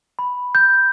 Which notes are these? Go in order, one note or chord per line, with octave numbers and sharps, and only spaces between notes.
B5
G6